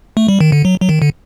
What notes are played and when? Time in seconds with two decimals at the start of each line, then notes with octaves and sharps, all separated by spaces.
0.17 A3
0.28 G3
0.41 D#3
0.52 D3
0.65 F#3
0.80 F#3
0.89 D#3
1.02 D3